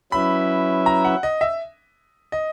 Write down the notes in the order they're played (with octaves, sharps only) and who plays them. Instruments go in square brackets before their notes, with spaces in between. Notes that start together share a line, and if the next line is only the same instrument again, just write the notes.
[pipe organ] F#3 C#4 E4 B4 E5 [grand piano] B5
[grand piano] A#5
F#5
D#5
E5
D#5